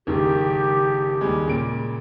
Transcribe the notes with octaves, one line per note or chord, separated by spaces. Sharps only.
F#1 G#2 D#3 G4
D#2 G3 G#3
A#2 C#3 D7